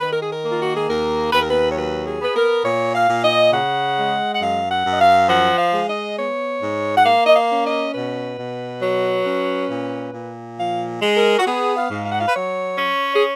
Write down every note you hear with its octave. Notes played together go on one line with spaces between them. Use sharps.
D#3 B4
A#4
G#4
A#4
A#3 F4
F#4
G#4
D#2 A#4
D#2 B4
A#4
B4
C#5
F#3 B4
G#4
B3 B4
A#4
A#2 C#5
F5
A#2
D#5
C#3 F#5
G#3
F#5
F#2 F5
F#5
F#2
D#5
F5
F3 F#5
F5
G#3
D#5
B3 C#5
G#2
F#5
A#3 F5
D#5
F5
C#4
D#5
B2 B4
B2
F#3
C#4
A#2
A#2
F3 F5
G#3
A#4
F#4
B3 G#4
F5
G#2
F5
F#5
F5
B4
F#3 C#5
C#4
G#4